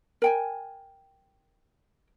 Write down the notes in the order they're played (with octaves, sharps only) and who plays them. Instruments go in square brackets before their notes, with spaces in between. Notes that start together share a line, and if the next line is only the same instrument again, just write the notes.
[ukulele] A#4 G5 G#5